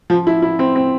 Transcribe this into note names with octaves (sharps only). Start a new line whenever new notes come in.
F3
E4
E4
C4
C4